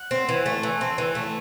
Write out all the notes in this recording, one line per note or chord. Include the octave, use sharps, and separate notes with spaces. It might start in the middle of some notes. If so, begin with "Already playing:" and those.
Already playing: F#5
C4
E3
A3
E3
C4
E3
A3